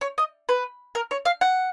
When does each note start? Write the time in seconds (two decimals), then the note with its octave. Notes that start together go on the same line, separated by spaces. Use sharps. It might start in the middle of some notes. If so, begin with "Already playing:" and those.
0.01 C#5
0.18 D#5
0.49 B4
0.95 A#4
1.11 C#5
1.25 F5
1.41 F#5